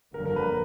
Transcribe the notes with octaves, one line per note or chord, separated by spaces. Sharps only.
G1 F2 D3 F#3 A#3 A#4
A#4
B4